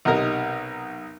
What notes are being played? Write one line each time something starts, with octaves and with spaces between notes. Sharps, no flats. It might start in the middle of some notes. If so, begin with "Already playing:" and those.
B1 C3 D#4 A#4